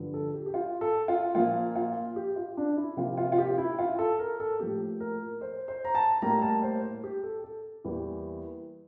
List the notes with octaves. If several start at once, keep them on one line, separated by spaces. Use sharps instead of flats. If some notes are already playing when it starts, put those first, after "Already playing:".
Already playing: G2 D3 F3
A4
G4
G4
F4
A4
F4
A#2 F3 A#3 F4
F4
G4
F4
D4
E4
C3 F3 A#3 F4
F4
F4
G4
E4
F4
A4
A#4
A4
A2 F3 A#3 G4
A#4
C5
C5
A#5
A5
A2 G3 A#3 A#5
A5
C5
C5
G4
A4
A4
E2 E3 G3 A#3